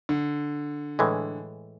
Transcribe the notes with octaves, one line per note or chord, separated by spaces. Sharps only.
D3
A2 E3 G#3